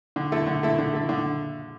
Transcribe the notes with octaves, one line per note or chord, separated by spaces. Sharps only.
D3
A3 E4
D3
A3 E4
D3
A3 E4
D3